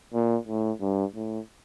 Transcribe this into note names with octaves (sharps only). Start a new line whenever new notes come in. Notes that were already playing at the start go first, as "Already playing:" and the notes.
A#2
A2
G2
A2